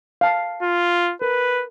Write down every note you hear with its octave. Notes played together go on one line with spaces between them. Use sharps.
F5 A5
F4
A#4 B4